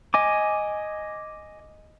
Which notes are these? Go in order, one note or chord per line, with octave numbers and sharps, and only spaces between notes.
D#5 G#5 D6